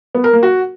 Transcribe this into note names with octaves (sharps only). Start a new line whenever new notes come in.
B3
A#4
A#3
F#4